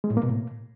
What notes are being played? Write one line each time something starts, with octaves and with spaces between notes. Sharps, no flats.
G#3
A2
A#3
B2
A2